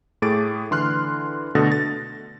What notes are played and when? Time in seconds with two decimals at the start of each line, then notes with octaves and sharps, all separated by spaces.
0.22 A2 A3 G#4 D6 A6 D7
0.71 D3 E3 C6 F6 F#6
1.55 B2 D3 A3 D#6 A6 A#6
1.72 A6